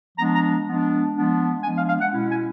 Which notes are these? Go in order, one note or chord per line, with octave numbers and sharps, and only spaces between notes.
F3 G#3 B3 D4 A#5
A#5
F3 G#3 B3 D4
F3 G#3 B3 D4
F3 G#3 B3 D4 G#5
F5
F5
F#5
B2 G#3 C#4 E4
G#5